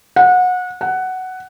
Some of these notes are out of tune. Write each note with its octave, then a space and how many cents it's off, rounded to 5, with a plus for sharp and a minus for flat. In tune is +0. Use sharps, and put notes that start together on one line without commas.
F#5 -25
F#5 +10